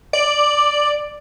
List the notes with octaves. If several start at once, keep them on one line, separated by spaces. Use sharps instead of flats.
D5